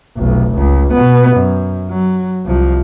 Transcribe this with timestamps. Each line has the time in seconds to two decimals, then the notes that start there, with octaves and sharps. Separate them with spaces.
0.16 F1 B1
0.54 C#2
0.93 B2 B3
1.36 F#2
1.90 F#3
2.46 C2 F3